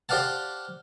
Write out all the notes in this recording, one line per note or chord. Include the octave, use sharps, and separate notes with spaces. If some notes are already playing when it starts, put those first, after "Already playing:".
G4 C5 D5 F5 F#5 A5